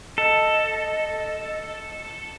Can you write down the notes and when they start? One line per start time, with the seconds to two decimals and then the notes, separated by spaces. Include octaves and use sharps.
0.18 A4 D#5